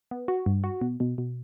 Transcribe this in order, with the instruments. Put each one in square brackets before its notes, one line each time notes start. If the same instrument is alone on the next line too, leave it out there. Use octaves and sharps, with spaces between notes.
[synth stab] B3
F#4
G2
F#4
B2
B2
B2